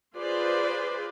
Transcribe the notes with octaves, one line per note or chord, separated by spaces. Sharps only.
F4 G#4 B4 C5 D5